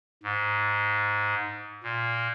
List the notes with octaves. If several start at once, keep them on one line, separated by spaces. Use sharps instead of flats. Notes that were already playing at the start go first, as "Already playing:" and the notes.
G#2
A#2